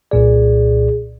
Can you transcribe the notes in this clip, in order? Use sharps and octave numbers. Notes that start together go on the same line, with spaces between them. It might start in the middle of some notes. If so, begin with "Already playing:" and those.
C2 A#2 G#4 D5